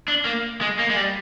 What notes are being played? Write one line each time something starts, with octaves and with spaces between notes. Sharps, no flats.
D4
A#3
G#3
A#3
G#3
G3